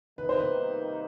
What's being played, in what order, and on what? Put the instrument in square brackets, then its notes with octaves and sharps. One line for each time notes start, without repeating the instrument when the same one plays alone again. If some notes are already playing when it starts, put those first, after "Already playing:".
[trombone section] C3 D#3 G3 A#3 D#4 [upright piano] B4
[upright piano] C5
B4